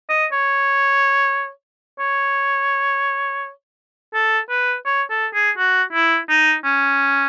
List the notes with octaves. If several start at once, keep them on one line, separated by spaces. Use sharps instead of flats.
D#5
C#5
C#5
A4
B4
C#5
A4
G#4
F#4
E4
D#4
C#4